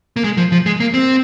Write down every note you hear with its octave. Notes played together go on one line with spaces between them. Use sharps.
A#3
G#3
F3
F3
G#3
A#3
C4